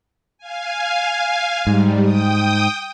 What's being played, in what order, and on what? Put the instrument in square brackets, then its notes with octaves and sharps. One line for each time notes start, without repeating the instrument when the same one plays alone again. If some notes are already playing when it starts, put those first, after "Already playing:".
[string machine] F5 G#5
[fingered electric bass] G#2 [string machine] G3
[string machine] G5 D#6